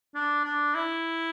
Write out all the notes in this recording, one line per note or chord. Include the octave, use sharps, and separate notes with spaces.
D4
D4
E4